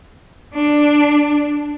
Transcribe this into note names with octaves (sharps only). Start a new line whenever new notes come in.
D4